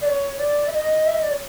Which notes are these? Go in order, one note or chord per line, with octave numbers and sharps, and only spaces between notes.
D5
C#5
D5
E5
D#5
E5
D#5
D5
C#5